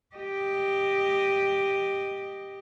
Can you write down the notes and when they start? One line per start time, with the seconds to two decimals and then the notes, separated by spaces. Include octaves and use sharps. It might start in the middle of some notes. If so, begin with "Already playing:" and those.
0.15 G4 D#5